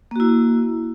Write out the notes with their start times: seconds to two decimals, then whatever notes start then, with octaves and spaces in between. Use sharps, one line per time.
0.11 A#3
0.16 F#4
0.20 E4